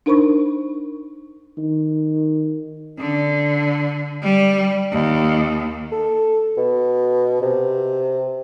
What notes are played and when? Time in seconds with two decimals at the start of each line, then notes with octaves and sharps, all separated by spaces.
0.06 D4 D#4 A#4 C5 B5 C#6
1.58 D#3
2.98 D3
4.22 G3
4.90 D#2
5.92 A4
6.57 B2
7.41 C3